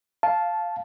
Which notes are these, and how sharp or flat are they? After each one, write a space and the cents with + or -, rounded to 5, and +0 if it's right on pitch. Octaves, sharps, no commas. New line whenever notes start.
F5 +0 A5 -10